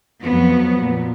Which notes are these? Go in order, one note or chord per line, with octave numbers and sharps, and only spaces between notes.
F2 F3 F#3 B3
A#2